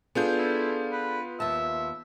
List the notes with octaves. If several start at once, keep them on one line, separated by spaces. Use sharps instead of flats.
B3 D4 F4 G#4 A4 G6
E4
B4
D#2 E5 A5